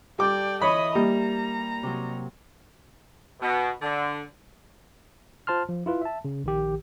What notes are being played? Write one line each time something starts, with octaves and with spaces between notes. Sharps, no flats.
G3 A4 D5 G5 D6
E3 B4 C#5 D#5 B5 D#6
G3 A#3 A#5
C3 F#3
B2
D3
F4 C5 A5 C6 F6
F3
E4 F4 B4
E5 A5
C#3
A#1 D#3 G4